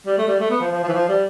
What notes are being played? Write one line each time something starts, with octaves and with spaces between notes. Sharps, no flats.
G3
A3
G3
A3
B3
F3
F3
F3
E3
F3
G3